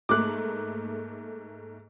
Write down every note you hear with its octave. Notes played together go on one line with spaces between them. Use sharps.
G#2 A3 A#3 D6 F#6